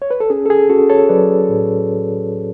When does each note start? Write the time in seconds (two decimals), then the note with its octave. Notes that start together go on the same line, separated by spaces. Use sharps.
0.02 C#5
0.11 B4
0.20 A4
0.30 C#4 G#4
0.46 A4
0.50 G#4
0.70 C#4 F#4 A4
0.90 A4 C#5
1.09 F#3 B4 D5
1.49 A2